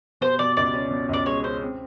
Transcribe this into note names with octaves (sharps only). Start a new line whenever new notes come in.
B2 C5
B2 D5
C#2 D5
C#4
B2
C#2 D5
G#3 C#5
C#4 C5
C4